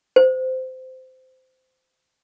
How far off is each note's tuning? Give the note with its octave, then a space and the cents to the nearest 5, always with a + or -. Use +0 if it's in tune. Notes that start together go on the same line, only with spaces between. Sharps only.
C5 -20